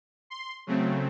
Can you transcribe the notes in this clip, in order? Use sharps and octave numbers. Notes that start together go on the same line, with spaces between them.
C6
C#3 F#3 A3 C4